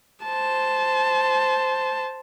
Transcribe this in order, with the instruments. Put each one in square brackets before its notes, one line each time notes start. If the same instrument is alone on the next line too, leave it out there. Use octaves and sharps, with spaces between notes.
[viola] C5 A5